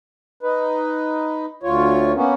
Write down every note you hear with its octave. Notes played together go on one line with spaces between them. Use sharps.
D#4 B4
D2 F4 C#5
A#3 B3 C#4